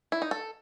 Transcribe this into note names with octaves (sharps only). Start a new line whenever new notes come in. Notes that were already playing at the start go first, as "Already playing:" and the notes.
E4
D#4
A4